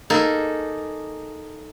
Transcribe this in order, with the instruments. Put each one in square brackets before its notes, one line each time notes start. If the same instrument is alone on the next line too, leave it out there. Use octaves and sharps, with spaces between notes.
[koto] A#3 D#4 G#4 A4